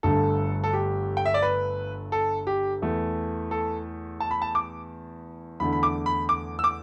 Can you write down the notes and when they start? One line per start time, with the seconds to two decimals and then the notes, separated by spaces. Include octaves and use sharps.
0.03 G1 G2 D3 A3 A4
0.64 A4
0.73 G4
1.17 G5
1.25 E5
1.34 D5
1.42 B4
2.12 A4
2.47 G4
2.82 E2 E3 A3
3.51 A4
4.20 A5
4.31 B5
4.42 A5
4.55 D6
5.60 E2 D3 A3 B5
5.73 B5
5.83 D6
6.06 B5
6.29 D6
6.59 E6
6.64 D6